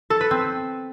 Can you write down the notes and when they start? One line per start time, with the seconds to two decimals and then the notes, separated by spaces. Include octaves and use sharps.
0.10 A4
0.21 B4
0.31 C4